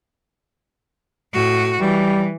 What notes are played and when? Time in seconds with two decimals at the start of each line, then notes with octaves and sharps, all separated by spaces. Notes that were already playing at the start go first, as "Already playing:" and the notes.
1.33 A2 F#4
1.81 E3 G3